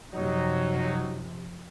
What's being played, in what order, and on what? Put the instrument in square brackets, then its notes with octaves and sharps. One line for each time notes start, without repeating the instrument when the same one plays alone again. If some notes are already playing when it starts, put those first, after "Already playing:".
[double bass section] F#2 C3 F3 [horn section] F#3 D#4